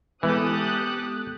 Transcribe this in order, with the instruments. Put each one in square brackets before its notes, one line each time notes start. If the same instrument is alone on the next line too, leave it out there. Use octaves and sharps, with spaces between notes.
[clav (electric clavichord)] E3 [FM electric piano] G#3 B3 [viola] G4 A4 [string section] D#6 F#6